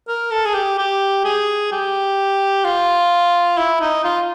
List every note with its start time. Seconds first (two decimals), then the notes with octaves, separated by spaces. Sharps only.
0.08 A#4
0.31 A4
0.46 G#4
0.54 G4
0.78 G4
1.25 G#4
1.72 G4
2.64 F4
3.58 E4
3.81 D#4
4.04 F4